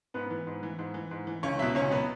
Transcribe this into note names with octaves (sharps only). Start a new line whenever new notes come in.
G#2 B3 B4
E3
G#2
E3
G#2
E3
G#2
E3
C#2 C#4 C#5
B2 F#3 E4 E5
C#2 C#4 C#5
B2 F#3 B3 B4